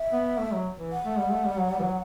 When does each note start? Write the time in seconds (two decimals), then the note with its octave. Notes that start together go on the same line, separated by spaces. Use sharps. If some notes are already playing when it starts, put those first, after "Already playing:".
Already playing: E5
0.13 B3
0.39 A3
0.52 F#3
0.79 E3
0.92 F#5
1.05 A3
1.18 G3
1.31 A3
1.45 G3
1.57 F#3
1.71 G3
1.79 E3
1.83 F#3